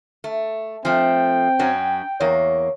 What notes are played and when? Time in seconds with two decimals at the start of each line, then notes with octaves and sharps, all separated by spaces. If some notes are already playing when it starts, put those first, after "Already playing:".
0.24 A3
0.85 F3 A3 C4 G5
1.59 F#2 F#3 C#4
2.20 E2 A#3 C#5